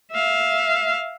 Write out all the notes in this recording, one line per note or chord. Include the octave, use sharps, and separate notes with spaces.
E5 F5